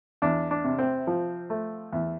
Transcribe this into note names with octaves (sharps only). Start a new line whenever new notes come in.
E2 D4
D4
C3
C4
F3
A3
E2